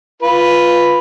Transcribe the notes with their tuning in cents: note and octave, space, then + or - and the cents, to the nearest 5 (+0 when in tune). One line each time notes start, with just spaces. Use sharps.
F4 +0 B4 +0